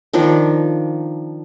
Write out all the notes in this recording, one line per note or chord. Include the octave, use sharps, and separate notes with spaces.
D#3 F3 D4